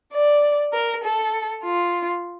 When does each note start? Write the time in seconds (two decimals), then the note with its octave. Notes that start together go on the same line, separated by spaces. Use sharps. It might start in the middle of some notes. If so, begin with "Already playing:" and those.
0.13 D5
0.73 A#4
1.04 A4
1.63 F4